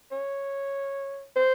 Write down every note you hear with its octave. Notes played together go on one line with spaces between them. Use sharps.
C#5
C5